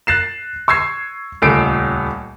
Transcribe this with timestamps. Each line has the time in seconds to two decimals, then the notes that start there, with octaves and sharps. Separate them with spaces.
0.07 F#6 A6 C7 E7
0.68 C#6 E6 G#6 C7
1.42 D#1 C#2 A3 A4 C7 D7